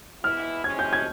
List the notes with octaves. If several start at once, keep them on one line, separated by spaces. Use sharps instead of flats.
E3 G#3 B3 E4 F6
C3 E3 G#3 C#4 G#6
G6
G#6